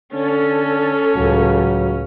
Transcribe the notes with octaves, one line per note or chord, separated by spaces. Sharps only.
D3 C#4 A4
C#2 A2 F#3